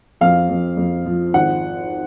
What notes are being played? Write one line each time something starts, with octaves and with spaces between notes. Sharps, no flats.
F2 F5
F2
F2
F3
G#1 F#5